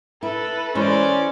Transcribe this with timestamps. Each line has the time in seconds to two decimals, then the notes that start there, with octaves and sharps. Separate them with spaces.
0.23 E4 A4 B4
0.75 E3 G#3 C#4 C5 D5 D#5